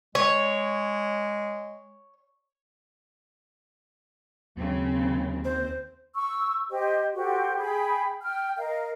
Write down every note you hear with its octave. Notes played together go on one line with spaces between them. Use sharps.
G#3 C#5
D#2 C#3 F#3 C4
C5
C#6 E6
G4 C5 D#5
F#4 G4 A4 C5
G#4 G5 B5
G5 F6
A#4 D#5 F5